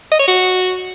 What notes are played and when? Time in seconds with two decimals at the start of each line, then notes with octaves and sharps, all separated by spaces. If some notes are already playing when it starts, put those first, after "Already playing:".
0.11 D#5
0.19 C#5
0.27 F#4